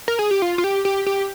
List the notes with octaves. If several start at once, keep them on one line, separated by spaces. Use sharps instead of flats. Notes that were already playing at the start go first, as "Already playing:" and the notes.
A#4
G#4
G4
F4
F4
G4
G4
G4